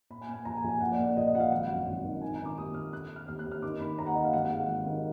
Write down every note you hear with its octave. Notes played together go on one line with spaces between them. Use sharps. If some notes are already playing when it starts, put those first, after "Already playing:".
A#2 B5
G#5
A#2
G#5
A#1 A#5
G#5
A#1
G#5
A#2 F#5
D5
A#2
D5
A#1 D#5
D#5
A#1 F#5
F5
G#1 F#5
F#2
G#1
D#3
D#3 G#5
A#5
D#3
D6
D#2 D#6
D#2 F6
D3 F#6
D3
F6
D#2 F6
F#6
D#2
F6
D#3 D6
D#3 B5
D#2 A#5
F#5
D#2 D#5
F5
G#1 F#5
F#5
G#2
F5
G#1
D#3